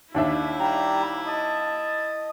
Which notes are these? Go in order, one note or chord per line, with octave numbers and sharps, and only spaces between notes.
D#2 D4 E4 E5
G3 G4 A#5
D#5 A5